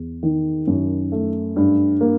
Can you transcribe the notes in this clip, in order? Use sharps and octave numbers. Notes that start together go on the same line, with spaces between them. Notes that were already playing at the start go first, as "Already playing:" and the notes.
Already playing: E2
D#3
F#2
A3
G2
A#3